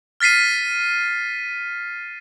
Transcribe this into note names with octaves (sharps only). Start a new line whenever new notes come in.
F6 A6 B6 C7 D#7